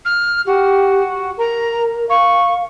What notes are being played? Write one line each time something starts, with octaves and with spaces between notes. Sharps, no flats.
F6
F#4 G4
A#4 A#5
F5 C#6